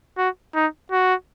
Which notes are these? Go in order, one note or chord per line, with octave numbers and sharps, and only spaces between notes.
F#4
D#4
F#4